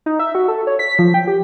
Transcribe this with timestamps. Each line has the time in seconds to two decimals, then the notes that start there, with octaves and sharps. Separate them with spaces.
0.06 D#4
0.19 E5
0.35 F#4
0.48 A4
0.67 C#5
0.79 B6
0.99 F3
1.14 G5
1.27 G4